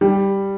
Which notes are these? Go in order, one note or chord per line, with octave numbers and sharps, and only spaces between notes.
G3